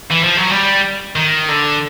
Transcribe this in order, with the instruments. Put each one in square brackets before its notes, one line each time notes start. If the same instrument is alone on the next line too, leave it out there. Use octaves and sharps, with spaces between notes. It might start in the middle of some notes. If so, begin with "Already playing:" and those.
[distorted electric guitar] E3
F3
F#3
G3
D#3
D3